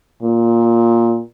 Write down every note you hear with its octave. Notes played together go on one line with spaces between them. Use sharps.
A#2